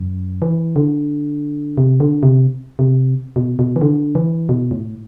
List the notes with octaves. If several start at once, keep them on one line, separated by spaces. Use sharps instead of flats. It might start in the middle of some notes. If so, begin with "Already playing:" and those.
Already playing: F#2
E3
D3
C3
D3
C3
C3
B2
B2
E3
D3
E3
B2
A2